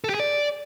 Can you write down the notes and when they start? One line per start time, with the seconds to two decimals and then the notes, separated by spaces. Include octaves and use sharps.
0.04 A4
0.09 G4
0.14 G#4
0.20 D5